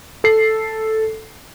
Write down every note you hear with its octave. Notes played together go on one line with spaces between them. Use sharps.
A4 C7